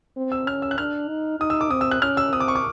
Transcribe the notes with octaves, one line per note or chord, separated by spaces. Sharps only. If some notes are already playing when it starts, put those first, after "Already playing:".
C4
E6
C#4 F6
E6
F#6
D4 F6
D#4
D#4 D#6
E6
D6
C4 D#6
E6
F#6
C#4 F6
E6
C4 D#6
D6
C#6
D6